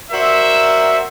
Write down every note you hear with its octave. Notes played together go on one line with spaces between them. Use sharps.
F#4 A#4 C5 D5 E5